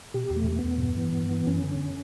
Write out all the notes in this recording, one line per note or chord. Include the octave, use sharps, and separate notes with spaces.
B2 G4
E2
A3
B2
A3
B3
E2
G2
E3
G2
E3
F#2 C#4
D3